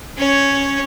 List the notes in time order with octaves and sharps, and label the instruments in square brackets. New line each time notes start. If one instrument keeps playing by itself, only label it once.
[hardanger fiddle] C#4 C#5